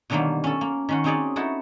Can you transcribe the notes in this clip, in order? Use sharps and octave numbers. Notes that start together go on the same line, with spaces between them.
B2 D3 D#3 F#3 G3 A#3
C#4 A4
A#3
D#3 C#4 F#4
C4 C#4 D#4 G#4 C#5 D5
D#4 E4 F#4 A4